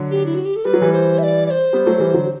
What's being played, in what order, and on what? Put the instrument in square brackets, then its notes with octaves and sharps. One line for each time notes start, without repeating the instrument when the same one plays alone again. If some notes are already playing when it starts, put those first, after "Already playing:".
Already playing: [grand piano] D3 F#3
[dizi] G4
E4
F#4
G4
A4
[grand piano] G3 [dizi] B4
[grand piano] F#3
E3 G3
[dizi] C5
E5
D5
D5
C5
[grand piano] G3 B3
F#3 A3
E3 G3
D3 F#3